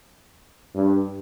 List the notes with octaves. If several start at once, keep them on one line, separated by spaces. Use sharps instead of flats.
G2